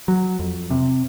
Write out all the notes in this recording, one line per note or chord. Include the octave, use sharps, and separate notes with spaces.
F#3
F2
C3